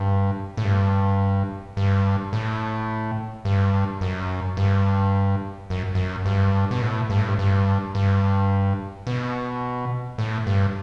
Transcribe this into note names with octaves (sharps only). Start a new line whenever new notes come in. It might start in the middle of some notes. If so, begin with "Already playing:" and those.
Already playing: G2
A2
G2
G2
A2
G2
F#2
G2
F#2
F#2
G2
B2
A2
G2
A2
G2
G2
G2
B2
A2
G2